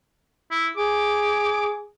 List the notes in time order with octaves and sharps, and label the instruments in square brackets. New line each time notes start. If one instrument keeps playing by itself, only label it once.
[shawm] E4
[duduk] G#4 [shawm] D6